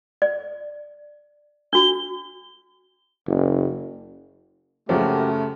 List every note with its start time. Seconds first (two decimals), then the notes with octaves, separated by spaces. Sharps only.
0.22 D5
1.73 D4 F#4 G7
3.27 F#1
4.89 F#2 C#3 F3 F#3 A3 A#3 F#4 G4